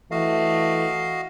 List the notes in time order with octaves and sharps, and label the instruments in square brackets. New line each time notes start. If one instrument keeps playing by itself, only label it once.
[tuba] E3 [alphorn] A3 [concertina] F#4 D#5 F5